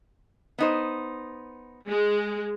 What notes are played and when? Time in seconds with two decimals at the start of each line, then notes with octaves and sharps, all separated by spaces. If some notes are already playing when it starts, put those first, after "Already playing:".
0.58 B3 D#4 C5
1.88 G#3